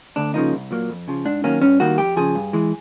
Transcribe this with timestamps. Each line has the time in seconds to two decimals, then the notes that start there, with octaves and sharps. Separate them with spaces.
0.16 D2 D4
0.34 C#3 F3 A#3 D#4
0.53 C2
0.71 A#2 F#3 A#3
0.89 F2
1.08 C#3 F3
1.25 G#2 D4
1.44 D#3 F#3 A#3 C#4
1.62 G2 C#4
1.80 D#3 G3 A#3 F#4
1.98 F2 G4
2.17 C#3 F3 G#4
2.35 G2
2.53 E3 G#3